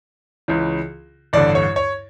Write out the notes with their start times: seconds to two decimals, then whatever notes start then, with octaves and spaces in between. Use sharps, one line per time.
0.48 C#2 C#3 E3
1.33 A1 G2 D3 D5
1.55 C#5
1.76 C#5